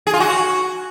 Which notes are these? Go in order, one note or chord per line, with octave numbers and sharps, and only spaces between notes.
G#4
F4
F#4